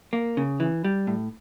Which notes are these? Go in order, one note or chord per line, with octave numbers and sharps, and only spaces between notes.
A#3
C#3
E3
G3
A2